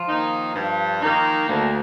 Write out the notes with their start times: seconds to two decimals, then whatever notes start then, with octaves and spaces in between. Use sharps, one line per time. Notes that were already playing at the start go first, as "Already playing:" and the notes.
Already playing: F3 F4
0.08 D#3 A#3 D#4
0.55 G2
1.02 D#3 A#3 D#4
1.49 D2 A#3